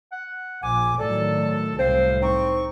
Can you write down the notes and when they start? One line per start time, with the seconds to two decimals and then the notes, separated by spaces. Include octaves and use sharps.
0.12 F#5
0.63 A#1 G#5 D6
0.99 A2 D#3 F#3 A4 D5
1.79 C2 A2 C4 C5 F5
2.22 C4 D#4 C#6